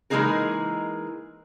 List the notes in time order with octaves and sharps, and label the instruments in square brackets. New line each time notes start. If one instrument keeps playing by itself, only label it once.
[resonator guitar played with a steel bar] E3 G#3 A#3 D#4 G#4 A#4